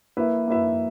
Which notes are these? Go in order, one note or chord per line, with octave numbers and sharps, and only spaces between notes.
A#3 E4 B4 E5
A#3 E4 B4 E5